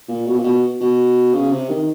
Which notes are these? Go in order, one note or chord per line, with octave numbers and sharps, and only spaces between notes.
A#2
B2
A#2
B2
B2
C#3
C3
D#3